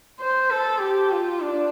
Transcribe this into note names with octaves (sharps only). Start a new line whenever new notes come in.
C5
A4
G4
F4
D4